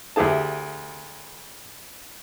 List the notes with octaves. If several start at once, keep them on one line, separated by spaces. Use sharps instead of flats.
D2 E4 G4 G#4 A5